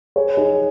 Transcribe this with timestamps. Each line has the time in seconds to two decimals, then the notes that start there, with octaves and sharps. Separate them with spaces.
0.16 G#4 C#5
0.37 D#4 G#4